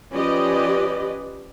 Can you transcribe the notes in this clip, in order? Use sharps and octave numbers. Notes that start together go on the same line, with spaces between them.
F3 C#4 G4 B4 D5 D#5